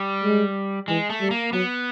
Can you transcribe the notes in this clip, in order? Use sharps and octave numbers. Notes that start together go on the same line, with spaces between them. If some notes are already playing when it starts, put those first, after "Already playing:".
Already playing: G3
G#3
E3 G#3
A3
G3
A#3
F#3 B3